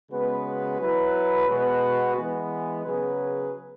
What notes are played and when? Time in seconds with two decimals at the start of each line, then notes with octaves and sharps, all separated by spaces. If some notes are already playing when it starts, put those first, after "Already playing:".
0.11 C#3 G#3 B3 F#4 B4
0.79 F#3 E4 B4
1.48 B2 G#3 B3 F#4 B4
2.15 E3 G#3 B3
2.84 C#3 F#3 B3 G#4 B4